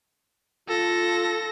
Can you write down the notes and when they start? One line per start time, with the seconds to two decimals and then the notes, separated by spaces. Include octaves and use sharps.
0.68 F4 A4 A#6